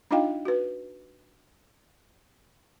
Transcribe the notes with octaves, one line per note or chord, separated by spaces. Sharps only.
D4 D#4 F4 D#5 F5 G5
F#4 B4